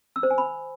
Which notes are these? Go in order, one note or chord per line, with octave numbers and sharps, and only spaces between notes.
E6
C5
G#5
B5